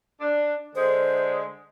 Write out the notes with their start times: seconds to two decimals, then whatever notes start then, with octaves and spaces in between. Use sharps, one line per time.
0.21 D4
0.75 D3 G#3 C5